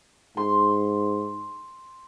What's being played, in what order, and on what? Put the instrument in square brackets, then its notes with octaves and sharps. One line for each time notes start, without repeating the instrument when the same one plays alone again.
[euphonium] G#2 [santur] C6